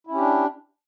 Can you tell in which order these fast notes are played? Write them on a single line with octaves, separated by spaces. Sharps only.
E4 C#4 G4 D4